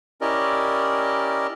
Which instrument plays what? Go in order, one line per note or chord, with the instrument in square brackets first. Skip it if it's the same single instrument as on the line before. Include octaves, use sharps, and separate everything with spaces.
[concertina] C#4 E4 G4 A#4 D5 D#5